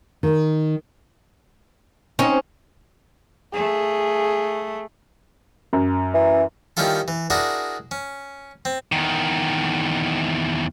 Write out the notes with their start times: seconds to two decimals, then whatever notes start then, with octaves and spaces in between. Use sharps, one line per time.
0.23 D#3
2.19 C4 C#4 D#4
3.54 A3 G#4
5.73 F#2
6.14 E3
6.77 D#3 G3 C#4 E4 F4 A4
7.08 E3
7.30 D4 E4 F#4 G#4 A#4 D5
7.91 C#4
8.65 C4
8.92 E2 D#3